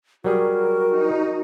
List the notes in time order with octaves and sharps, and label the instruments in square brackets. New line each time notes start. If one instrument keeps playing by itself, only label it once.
[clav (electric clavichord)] F#3 G3 G#4 [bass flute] F#4 [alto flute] A#4
[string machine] D#4